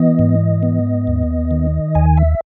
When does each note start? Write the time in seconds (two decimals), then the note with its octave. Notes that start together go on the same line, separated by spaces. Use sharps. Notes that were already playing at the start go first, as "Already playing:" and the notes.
Already playing: E3 B3 D#5
0.19 G#2
0.63 B3
1.07 D#2
1.51 D#3
1.95 D#2 G#5
2.17 E5